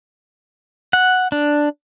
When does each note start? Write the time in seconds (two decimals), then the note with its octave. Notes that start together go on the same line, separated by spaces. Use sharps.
0.93 F#5
1.32 D4